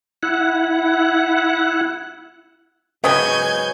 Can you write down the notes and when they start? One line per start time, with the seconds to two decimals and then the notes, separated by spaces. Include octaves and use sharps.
0.23 E4 F#5
3.04 G#2 C#3 F#3 B4 C#5 D#5 G#5 G6